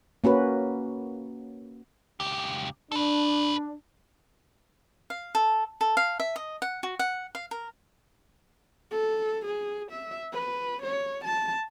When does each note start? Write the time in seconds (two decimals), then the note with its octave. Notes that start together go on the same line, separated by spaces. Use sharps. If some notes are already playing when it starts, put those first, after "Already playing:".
0.24 A#3 C#4 F#4 B4
2.20 C#2 G4
2.92 D4 A4 B4
5.10 F5
5.35 A4
5.81 A4
5.97 F5
6.20 E5
6.36 D#5
6.62 F#5
6.83 F#4
6.99 F#5
7.35 F5
7.51 A#4
8.91 A4
9.46 G#4
9.91 E5
10.33 B4
10.82 C#5
11.25 A5